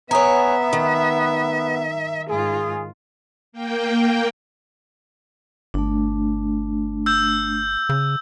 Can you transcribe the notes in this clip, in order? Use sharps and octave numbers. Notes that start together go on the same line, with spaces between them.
B3 C#5 E5 G#5 A#5 D#6
D#3
G#2 F4 G#4
A#3 G5
G1 A3 D4
E6 G6
C#3